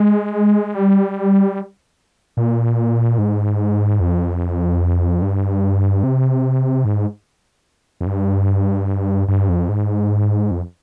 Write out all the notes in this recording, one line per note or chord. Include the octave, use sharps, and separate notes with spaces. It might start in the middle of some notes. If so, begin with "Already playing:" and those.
Already playing: G#3
G3
A#2
G#2
F2
G2
C3
G#2
F2
G2
G2
F2
G#2
F2